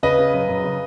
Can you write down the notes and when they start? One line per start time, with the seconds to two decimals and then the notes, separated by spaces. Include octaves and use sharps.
0.03 C#3 B4 D#5
0.19 C#3
0.34 F#2
0.49 F#2
0.64 C#3